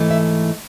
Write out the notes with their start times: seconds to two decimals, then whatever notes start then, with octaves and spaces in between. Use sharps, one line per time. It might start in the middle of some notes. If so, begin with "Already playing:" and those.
Already playing: G#2 E3 A3
0.11 E5